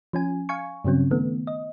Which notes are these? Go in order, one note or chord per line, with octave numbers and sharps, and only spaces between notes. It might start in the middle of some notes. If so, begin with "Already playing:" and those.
F3 C#4 G#5
F5 G#5 C#6
G2 C#3 F#3 C4 C#4
D#3 A3 B3
D#5